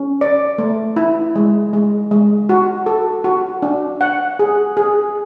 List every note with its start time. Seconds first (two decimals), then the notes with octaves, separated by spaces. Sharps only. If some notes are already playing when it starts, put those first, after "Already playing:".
Already playing: C#4
0.21 D5
0.58 A3
0.96 E4
1.36 G#3
1.73 G#3
2.11 G#3
2.49 F#4
2.86 A4
3.24 F#4
3.62 D4
4.01 F#5
4.39 G#4
4.77 G#4